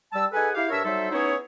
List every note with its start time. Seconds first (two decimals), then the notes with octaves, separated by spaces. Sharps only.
0.13 G3 A5 E6
0.33 D#4 G#4 A4 B4 F#5 G#5
0.55 E4 G4 F5
0.70 G2 D4 A#4 C#5 E5 E6
0.84 F#3 G3 D#4 A4 C5 E5
1.12 B3 C#4 D#4 E4 G#4 C#5